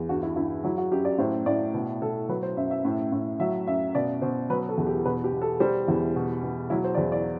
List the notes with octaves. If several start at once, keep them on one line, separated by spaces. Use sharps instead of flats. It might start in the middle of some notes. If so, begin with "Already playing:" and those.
Already playing: E2
G2 F#4
E4
G2 E4
F#3 E4
F#4
F#2 G4
D5
A2 C5
A2 D5
B2
B2 A4
F#3 B4
C5
F#2 E5
E5
A2
A2
F#3 E5
F#2 E5
B2 D5
B2 C5
F#3 B4
A4
E2
G4
B2 B4
G4
B2
A4
G3 C5
E2 E4
B2
B2
F#3 E4
C5
D5
E2 C5
D5